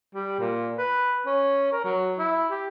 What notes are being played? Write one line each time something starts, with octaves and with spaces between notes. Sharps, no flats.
G3
A#2
B4
C#4
A#4
F#3
E4
G4